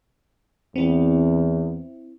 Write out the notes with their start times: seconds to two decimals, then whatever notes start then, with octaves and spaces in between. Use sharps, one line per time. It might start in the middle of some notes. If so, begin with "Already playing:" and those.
0.76 E2 C4 E4